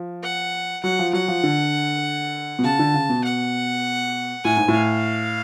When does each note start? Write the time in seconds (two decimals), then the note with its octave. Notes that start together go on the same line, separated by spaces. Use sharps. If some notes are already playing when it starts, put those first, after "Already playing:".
Already playing: F3
0.24 F#5
0.84 F#3 F#5
0.99 F3
1.13 F#3 F#5
1.28 F3
1.44 D3
2.59 B2
2.64 C#3 A5
2.79 D3
2.94 C#3
3.09 B2
3.24 F#5
4.44 A2 G#5
4.57 G#2
4.68 A2
4.74 F5